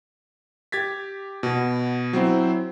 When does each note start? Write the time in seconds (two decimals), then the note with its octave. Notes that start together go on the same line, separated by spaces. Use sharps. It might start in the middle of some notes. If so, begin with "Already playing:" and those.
0.72 G4 G#6 A6 B6
1.43 B2
2.13 F#3 C4 E4 C5